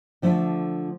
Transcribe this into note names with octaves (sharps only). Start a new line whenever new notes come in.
D3 F3 A3